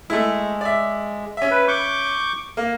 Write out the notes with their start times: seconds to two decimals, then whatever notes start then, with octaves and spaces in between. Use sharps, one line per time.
0.10 G#3 A3 E4
0.61 D5 E5
1.37 C#4 E5
1.51 B4
1.68 C#6 D6 G6
2.57 A#3